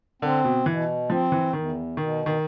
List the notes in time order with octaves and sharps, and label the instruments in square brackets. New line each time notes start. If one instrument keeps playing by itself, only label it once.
[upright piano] D3 [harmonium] C4
[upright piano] B2
[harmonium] B2 [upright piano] E3
[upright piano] F3 [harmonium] C4
[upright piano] E3
[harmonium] E2 [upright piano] D#3
[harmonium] B2 [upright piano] D#3
[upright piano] D#3